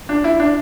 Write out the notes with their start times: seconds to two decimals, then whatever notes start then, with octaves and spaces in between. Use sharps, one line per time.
0.09 D4
0.24 E4
0.40 D4